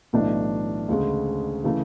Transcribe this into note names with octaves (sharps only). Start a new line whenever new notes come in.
B1 A2 E3 A3 D4
D2 C#3 G#3
C#3 E3 A3